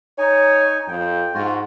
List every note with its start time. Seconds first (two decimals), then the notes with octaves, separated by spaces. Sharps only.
0.18 D#4 C#5 G#5
0.88 F2 G5
1.34 G#2 F4 F#4